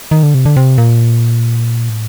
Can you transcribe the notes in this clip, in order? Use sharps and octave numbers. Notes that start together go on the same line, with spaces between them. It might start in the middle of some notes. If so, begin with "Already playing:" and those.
D#3
D3
C3
D3
C3
A#2
A2